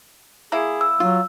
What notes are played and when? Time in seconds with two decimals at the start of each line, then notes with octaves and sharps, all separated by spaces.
0.52 A#3 E4 G#4
0.81 E6
1.00 F#3 F4